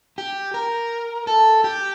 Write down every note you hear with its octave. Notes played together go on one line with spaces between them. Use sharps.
G4
A#4
A4
G4